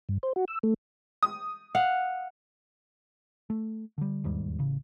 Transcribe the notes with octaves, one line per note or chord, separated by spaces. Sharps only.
G2
C5
F#4
E6
A3
D#6
F5 F#5
A3
D3 G3
E1 D#2 G#2 G3
A1 C#3